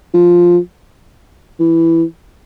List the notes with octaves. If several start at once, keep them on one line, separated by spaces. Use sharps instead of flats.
F3
E3